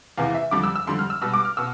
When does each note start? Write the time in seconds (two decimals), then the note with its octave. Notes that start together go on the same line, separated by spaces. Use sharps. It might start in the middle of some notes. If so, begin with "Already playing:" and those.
0.18 E2 C3 E3 F5
0.35 E5
0.51 F2 D3 G3 D6
0.63 E6
0.76 E6
0.87 F2 D3 G3 C6
0.99 F6
1.10 E6
1.22 B2 G3 E6
1.34 D6
1.45 F6
1.57 B2 E6